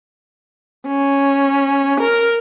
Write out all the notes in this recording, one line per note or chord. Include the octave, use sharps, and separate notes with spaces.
C#4
A#4